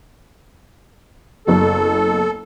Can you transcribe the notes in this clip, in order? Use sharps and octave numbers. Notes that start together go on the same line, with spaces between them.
F#1 B3 A4